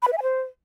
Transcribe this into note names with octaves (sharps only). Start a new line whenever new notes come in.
B5
B4
E5
G#5
C5